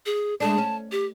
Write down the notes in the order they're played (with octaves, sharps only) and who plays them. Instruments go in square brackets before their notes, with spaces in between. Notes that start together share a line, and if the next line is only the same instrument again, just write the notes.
[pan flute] G#4
[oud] G#3 A3 D4 [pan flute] A5
[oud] C#4
[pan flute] G4